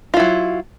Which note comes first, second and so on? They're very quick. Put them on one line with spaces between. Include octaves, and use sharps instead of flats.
F4 E4 F#3